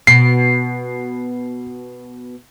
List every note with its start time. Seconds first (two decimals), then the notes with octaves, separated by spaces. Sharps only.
0.07 B2 C7